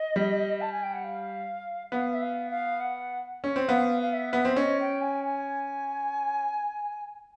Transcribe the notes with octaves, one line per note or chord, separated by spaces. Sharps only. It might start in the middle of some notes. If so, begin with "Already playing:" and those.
Already playing: D#5
G3
A5
G#5
G5
F#5
F5
B3 F5
E5
F5
F5
F#5
C#4
C4
B3 F5
F5
E5
B3
C4
C#4 D#5
G5
G#5
G#5